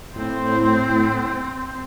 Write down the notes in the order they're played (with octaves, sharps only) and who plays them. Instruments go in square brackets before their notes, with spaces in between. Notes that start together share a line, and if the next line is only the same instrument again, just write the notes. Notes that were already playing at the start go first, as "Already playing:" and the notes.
[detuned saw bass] A2 [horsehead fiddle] C4 C5